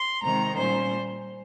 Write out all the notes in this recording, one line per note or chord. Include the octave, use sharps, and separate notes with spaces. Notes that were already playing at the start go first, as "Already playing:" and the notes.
Already playing: C6
C3 D#3 G#3 C4 A#5
A#2 G3 C#4 C5